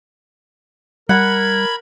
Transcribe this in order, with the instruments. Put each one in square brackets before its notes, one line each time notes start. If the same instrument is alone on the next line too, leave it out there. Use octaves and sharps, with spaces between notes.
[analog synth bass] G3 [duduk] A#4 [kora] F#5 [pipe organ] B5 G#6